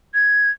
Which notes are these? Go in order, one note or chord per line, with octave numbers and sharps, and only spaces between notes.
G#6